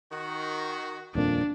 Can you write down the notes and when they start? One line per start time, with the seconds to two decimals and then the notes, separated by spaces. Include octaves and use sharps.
0.12 D#3 F#4
1.15 D#1 F2 A#2 D4